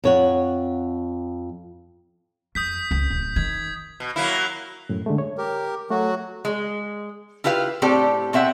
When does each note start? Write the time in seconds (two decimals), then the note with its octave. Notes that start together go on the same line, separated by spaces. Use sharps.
0.04 F2 C#5 F#5
2.55 F2 D#6 G6 B6
2.91 C#2 C#4
3.10 D1
3.36 D#3 G#6
4.00 B2
4.16 F#3 A#3 E4
4.89 F#2 A2
5.06 D3 G#3 A3
5.18 C#5
5.38 G4 A#4
5.90 F#3 A3 F#4 A4
6.45 G#3
7.44 E4 F4 G4 B4 F5
7.82 A2 C4 G4 A4 D5
8.33 B2 C4 E5 F#5